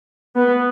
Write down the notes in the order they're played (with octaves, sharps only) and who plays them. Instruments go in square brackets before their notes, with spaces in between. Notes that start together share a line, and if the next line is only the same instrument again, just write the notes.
[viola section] B3